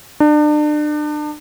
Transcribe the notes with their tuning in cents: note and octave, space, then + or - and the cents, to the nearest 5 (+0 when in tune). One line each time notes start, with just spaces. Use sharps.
D4 +35